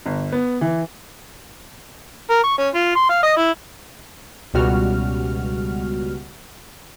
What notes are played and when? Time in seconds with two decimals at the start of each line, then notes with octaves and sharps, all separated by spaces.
0.06 G1
0.32 B3
0.61 E3
2.30 A#4
2.44 C#6
2.58 C#4
2.75 F4
2.95 C6
3.10 F5
3.23 D#5
3.37 E4
4.54 C#2 B2 G3 F#4 F6